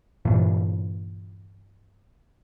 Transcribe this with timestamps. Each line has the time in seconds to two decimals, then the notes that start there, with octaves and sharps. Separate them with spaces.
0.25 G2 A#2 E3